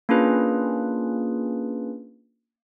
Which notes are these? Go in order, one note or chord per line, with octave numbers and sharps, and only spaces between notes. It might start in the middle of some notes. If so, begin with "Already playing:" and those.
A#3 C#4 D4 F4 G#4 B4